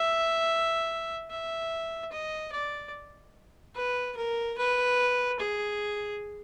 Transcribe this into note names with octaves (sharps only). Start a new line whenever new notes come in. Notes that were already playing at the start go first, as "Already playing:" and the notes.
Already playing: E5
E5
D#5
D5
B4
A#4
B4
G#4